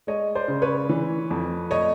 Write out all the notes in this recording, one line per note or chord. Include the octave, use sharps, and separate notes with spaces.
G#3 C#5 D#5
C5 D5
C#3
B4 C#5
E3
F2
A3 C#5 D#5